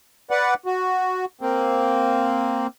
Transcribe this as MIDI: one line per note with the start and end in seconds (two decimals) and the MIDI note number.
0.31 0.54 71
0.31 0.54 74
0.31 0.54 78
0.66 1.25 66
1.41 2.67 58
1.41 2.67 60